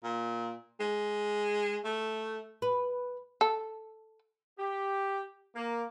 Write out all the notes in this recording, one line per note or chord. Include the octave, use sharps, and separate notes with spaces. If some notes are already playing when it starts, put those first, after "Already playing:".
A#2
G#3
A3
B4
A4
G4
A#3